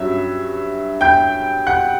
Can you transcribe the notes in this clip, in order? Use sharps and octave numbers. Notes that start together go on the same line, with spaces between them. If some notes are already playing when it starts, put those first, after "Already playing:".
Already playing: G2 F#3 C#4 E5 E6
G5 G6
F#5 F#6